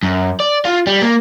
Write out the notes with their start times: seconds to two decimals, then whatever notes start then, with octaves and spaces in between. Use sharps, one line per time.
0.03 F#2
0.40 D5
0.65 F4
0.87 G3
1.02 A#3